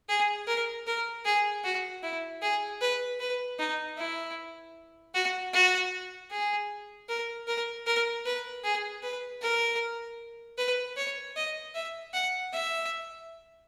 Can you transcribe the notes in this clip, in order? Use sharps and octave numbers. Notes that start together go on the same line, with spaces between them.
G#4
A#4
A#4
G#4
F#4
E4
G#4
B4
B4
D#4
E4
F#4
F#4
G#4
A#4
A#4
A#4
B4
G#4
B4
A#4
B4
C#5
D#5
E5
F#5
E5